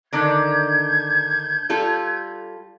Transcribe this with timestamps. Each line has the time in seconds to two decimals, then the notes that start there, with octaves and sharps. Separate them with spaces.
0.13 D3 D#3 D4 G6 G#6
1.70 G3 F4 A4